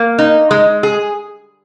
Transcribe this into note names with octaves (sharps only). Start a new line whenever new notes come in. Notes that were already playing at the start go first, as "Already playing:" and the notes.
Already playing: A#3
D#4
G#3
G#4